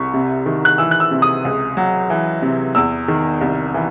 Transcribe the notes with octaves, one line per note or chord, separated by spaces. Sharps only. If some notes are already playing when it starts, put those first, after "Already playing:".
Already playing: C2 C#6
C3
D#3
F#6
E3 E6
F#6
E6
C3
D#6
C#2
F#3
E3
C3
E2 E6
D#3
C2
E3